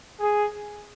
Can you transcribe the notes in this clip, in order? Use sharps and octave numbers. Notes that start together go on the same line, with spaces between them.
G#4